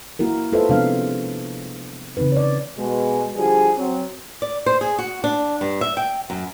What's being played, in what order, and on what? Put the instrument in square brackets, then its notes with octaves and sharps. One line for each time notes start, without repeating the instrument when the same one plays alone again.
[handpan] A#3 E4 F#4 A#4
F4 A4 B4 C5 D#5 E5
C3 F3 G#3 B3 D4 F5
C#3 E3 C4 D#4 B4
C#5 D5
[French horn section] B2 G#3
D3 F3 G3 F#4 G#4
F#3 C4
[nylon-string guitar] D5
C5
G#4
F#4
D4
G2
E5
G5
F#2